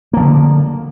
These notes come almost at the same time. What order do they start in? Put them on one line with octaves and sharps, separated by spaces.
A#3 F3 D3